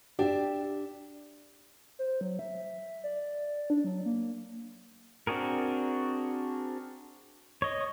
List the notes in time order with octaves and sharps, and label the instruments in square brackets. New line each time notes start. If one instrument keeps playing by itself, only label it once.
[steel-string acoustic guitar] D4 E5 [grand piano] G4
[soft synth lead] C5
F#3
E5
D5
D4
F#3
A#3
[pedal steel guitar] C4 D4 F#4 G#4 A#4
C#5 D#5